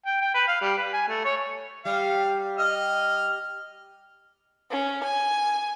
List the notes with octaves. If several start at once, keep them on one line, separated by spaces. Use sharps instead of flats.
G5
G5
B4
F5
G3
B4
G#5
A3
C#5
G3 F5
D#5 F6
C#4
G#5